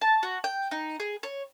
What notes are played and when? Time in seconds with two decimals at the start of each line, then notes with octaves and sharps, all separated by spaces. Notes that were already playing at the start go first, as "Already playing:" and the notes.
0.01 A5
0.23 F#4
0.44 G5
0.71 D#4
1.00 G#4
1.23 C#5